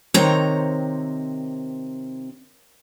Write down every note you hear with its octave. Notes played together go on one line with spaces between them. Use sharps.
C3 D#3 C4 C#5 A#5